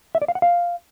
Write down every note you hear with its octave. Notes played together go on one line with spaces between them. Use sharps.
E5
D5
F5
F#5
F5